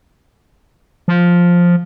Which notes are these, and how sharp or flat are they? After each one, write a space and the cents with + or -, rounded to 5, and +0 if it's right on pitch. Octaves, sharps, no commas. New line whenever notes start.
F3 +5